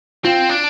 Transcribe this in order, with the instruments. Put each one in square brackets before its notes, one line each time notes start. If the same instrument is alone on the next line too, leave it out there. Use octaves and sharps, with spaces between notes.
[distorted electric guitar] C4 [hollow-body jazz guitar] F4
[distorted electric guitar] D4